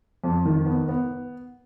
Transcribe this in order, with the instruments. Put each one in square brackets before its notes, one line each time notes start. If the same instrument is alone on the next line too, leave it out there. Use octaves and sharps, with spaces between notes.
[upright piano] F2
D#3
B3
B3